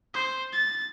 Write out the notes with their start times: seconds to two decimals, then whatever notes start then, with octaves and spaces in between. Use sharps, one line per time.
0.14 C5
0.53 A6